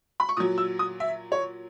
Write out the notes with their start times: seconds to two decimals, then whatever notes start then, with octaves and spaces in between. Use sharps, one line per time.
0.20 B5
0.29 C#6
0.37 A#2 F#3 D#6
0.58 E6
0.79 D#6
1.00 E5
1.32 C#5